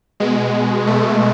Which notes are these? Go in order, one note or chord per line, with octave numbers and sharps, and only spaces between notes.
B2 G#3
A3